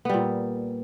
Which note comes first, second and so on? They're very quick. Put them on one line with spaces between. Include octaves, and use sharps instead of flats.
B3 G3 A#2